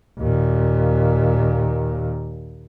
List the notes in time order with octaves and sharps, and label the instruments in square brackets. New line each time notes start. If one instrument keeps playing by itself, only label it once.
[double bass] D#2 A#2